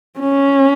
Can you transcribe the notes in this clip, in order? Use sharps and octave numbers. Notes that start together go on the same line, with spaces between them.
C#4